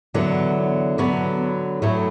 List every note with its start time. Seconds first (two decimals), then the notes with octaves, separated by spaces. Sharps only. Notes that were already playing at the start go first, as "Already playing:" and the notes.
0.14 E2 D3 F#3 B3
0.98 D3 F#3 B3 F#4 B4
1.82 A2 F#3 A3 E4